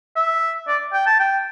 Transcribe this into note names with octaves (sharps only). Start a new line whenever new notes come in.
E5
D5
G5
A5
G5